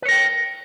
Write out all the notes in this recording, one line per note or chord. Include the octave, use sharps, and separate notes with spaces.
A#4 B4 C#5 G5